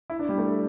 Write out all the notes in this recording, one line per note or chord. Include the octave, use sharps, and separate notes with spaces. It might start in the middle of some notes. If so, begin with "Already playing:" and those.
E4
D4
G3
A3